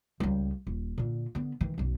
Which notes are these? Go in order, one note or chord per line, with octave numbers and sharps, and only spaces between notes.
C#2 G3
D#1
A#2 D3
D3 B3
D#3 E3
B1 F#2